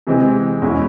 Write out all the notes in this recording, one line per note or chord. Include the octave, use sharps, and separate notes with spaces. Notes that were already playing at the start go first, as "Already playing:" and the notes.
C3 E3 G#3 C4
E2 B2 G#3 C#4 E4